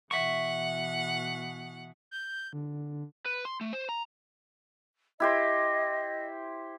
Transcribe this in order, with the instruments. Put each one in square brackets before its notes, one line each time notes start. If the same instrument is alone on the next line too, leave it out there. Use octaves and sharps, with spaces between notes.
[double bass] B2 E3 [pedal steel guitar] E5 C#6 [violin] F#5
[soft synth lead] G6
D3
[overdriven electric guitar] B4
C6
A3
C5
A#5
[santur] E4 G4 C5 [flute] D#5